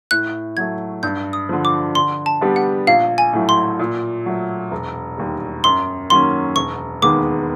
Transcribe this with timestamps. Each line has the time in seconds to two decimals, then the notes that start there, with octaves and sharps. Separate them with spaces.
0.11 A2 F#6
0.57 F#3 A3 G#6
1.03 G2 G6
1.33 D#6
1.49 D3 F3
1.65 D6
1.95 D3 C6
2.26 A5
2.41 G3 B3 D4 G4
2.56 F#5
2.87 A#1 F5
3.18 G#5
3.33 A2 F#3 A3
3.49 C6
3.79 A#2
4.26 F#3 A3
4.71 E1
5.17 D#2 D#3 G3
5.64 F#2 C6
6.10 D#3 F#3 A#3 C#4 C6
6.56 E1 C#6
7.02 D#2 D#3 G#3 B3 D6